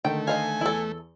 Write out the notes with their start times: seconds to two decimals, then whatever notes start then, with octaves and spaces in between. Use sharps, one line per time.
0.05 D3 D#3 A3 D#4 G5
0.28 C5 D#5 F5 G#5
0.61 E2 E4 A4